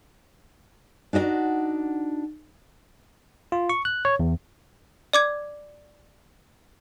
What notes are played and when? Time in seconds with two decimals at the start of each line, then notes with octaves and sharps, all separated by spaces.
1.13 D4 D#4 F#4 D#5 F#5
3.52 F4
3.69 C#6
3.85 F#6
4.05 C#5
4.19 E2
5.13 D5 D6 G#6